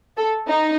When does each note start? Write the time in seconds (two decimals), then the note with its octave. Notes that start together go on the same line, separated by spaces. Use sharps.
0.17 A4
0.48 D#4